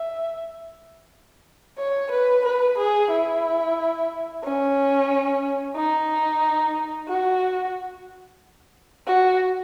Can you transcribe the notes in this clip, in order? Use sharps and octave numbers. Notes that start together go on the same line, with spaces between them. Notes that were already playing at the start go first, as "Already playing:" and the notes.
Already playing: E5
C#5
B4
B4
G#4
E4
C#4
D#4
F#4
F#4